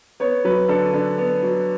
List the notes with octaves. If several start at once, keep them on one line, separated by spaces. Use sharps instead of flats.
B3 C#5
F#3 B4
D3 A4
D3
B3
F#3